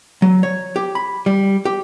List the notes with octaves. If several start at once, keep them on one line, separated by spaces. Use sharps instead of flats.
F#3
C#5
G4
B5
G3
G4